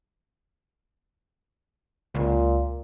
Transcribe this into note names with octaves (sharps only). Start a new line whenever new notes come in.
C#2 A#2